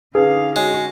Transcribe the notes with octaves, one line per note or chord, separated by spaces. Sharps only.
D3 C#4 D#4 G#4 B4 F5
G#3 F#4 C#5